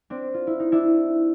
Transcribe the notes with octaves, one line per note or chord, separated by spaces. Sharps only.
C4 D4
F4
E4
D#4
D4 E4